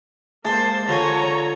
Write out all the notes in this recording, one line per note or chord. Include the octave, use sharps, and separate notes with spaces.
G#3 A#3 C5 A5 C6
D3 F3 C#5 G#5 A#5